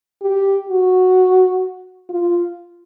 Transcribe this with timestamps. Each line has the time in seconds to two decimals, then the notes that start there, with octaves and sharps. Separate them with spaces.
0.22 G4
0.69 F#4
2.10 F4